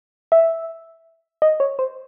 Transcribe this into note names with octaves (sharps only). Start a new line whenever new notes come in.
E5
D#5
C#5
C5